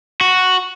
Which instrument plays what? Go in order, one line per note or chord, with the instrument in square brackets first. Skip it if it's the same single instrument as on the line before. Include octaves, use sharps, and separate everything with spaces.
[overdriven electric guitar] F#4